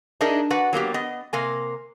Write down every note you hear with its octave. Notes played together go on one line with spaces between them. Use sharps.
D4 D#4 G#4 A#4 D#5 E5
F#4 B4 D5 F#5
F#3 A#3 B3 G4
B3 D#5
C3 A#3 G#5